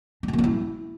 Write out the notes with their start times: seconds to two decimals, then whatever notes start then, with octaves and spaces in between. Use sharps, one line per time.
0.23 D4
0.28 A3
0.33 A#3
0.38 D4
0.44 E4